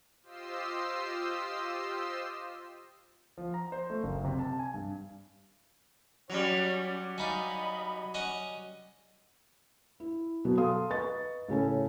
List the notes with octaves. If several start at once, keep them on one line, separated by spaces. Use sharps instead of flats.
F4 G4 C5 D#5 E6 C7
F3
A#5
C5
A3
F#1
C3
A5
G#5
G2
F#3 G3 C#4
C#4 D#4 D#5 F5 B5
C#4 D#5 F#5
E4
B2 F#3 B3
A4 F5 C6 D#6
B4 D#5 C#6 A6
A2 C#3 C#4 A4